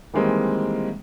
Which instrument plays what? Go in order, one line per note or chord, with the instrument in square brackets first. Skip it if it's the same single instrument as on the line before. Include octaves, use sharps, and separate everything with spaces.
[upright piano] D#3 E3 G3 G#3 A#3 C4